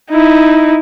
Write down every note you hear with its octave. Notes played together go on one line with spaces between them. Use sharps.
D#4 E4